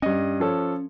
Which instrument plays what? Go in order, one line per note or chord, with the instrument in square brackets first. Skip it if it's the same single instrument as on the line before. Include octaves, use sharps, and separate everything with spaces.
[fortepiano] G2 D#5 [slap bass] C#4
[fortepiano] F3 A4 C#5